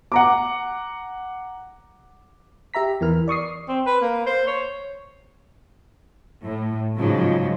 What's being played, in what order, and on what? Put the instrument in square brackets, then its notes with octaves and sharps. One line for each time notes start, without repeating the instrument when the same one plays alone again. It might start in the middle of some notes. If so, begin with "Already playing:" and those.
[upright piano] F#5 A#5 D6
[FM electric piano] G4 E5 A#5 B6
E2 E3 A#4 F6
D5 C#6 D#6 C7
[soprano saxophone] C4
B4
A#3
C5
C#5
[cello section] A2
G#2 C#3 F3 F#3